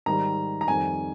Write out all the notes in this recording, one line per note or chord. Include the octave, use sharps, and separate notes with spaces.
G#2 D#3 G3 A#5
A#5
F2 D#3 G3 G#5